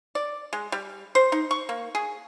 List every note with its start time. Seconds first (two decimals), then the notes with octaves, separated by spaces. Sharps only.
0.15 D5
0.53 G#3
0.72 G3
1.15 C5
1.32 D#4
1.51 C#6
1.69 A#3
1.95 G#4